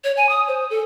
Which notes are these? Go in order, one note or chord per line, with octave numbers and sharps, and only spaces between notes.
C#5
G#5
D#6
C5
A4